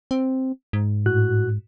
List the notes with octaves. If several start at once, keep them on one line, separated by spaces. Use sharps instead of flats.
C4
G#2
A2 F#4 F#6